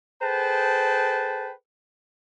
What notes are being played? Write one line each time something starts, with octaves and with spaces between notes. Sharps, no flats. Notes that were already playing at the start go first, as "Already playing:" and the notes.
G#4 A4 B4 C5 G5 A5